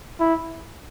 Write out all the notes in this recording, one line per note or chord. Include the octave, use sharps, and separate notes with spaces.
E4